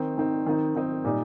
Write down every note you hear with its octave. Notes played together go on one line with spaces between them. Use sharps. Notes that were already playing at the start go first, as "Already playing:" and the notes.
Already playing: D#3 C4 D#4
D#3 C4 D#4
D#3 C4 D#4
D#3 C4 D#4
A#2 G3 D#4